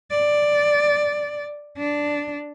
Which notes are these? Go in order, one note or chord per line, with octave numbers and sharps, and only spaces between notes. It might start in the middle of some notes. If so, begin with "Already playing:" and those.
D5
D4